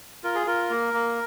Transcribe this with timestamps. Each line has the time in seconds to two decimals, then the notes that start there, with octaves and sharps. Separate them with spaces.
0.24 F4 A#4
0.35 G#4
0.47 F4 A#4
0.70 A#3
0.94 A#3